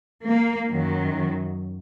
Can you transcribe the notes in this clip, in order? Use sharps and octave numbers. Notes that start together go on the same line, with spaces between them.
A#3
F#2 D#3 F#3